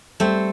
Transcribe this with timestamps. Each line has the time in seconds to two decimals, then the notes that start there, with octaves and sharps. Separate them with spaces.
0.20 G3 A3 C4